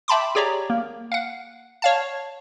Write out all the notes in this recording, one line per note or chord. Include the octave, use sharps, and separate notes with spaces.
E5 G5 A5 B5 C6 D6
G4 G#4 C#5 D5 A#5
A#3
F5 F#5
C#5 F5 A5